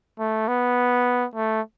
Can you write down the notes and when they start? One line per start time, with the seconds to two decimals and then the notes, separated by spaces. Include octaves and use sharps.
0.19 A3
0.48 B3
1.35 A3